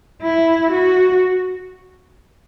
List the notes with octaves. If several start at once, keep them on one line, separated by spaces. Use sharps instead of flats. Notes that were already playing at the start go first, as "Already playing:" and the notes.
E4
F#4